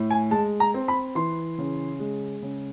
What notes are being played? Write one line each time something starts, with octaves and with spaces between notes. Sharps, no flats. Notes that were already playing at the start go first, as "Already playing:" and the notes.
Already playing: A2
G#5
G#3 A5
A#5
C4
B5
E3 C6
C#3
G#3
C#3